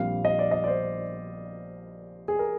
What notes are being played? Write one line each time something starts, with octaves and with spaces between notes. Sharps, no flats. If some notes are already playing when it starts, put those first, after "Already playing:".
Already playing: A#1 A#2 G3 C4 F5
D#5
D5
D#5
D5
C5
G#4
A#4